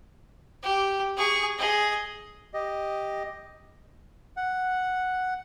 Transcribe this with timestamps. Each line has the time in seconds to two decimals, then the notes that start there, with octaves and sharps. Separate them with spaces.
0.63 G4
1.17 G#4 C#6
1.58 G#4 D#5
2.54 G4 D#5
4.37 F#5